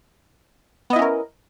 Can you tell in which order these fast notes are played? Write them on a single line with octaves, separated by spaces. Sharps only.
B3 D#5 E4 C#4 A#4